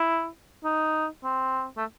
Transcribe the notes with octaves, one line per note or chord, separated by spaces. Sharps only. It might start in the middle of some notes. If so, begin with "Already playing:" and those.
Already playing: E4
D#4
C4
A3